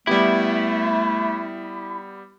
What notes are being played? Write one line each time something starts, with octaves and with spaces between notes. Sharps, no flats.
G3 A3 B3 E4 G4